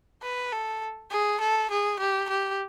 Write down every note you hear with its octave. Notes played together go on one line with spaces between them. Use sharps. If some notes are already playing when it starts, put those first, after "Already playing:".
B4
A4
G#4
A4
G#4
G4
G4